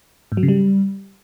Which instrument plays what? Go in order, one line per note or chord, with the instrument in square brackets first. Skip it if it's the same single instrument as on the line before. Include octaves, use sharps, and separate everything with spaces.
[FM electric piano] G#2
F#3
C#3
G3